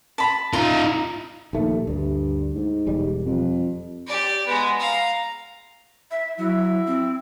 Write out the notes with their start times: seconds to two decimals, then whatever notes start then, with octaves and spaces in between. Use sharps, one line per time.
0.18 A5 B5
0.53 D#4 F4 A#5
1.53 A#1 D#2 A3
1.87 D2 G2
2.55 G#2
2.87 E1 G3
3.25 F2
4.07 G4 D5
4.46 G#3 B3
4.80 F5 A#5
6.11 E5
6.38 F#3 E4
6.87 C4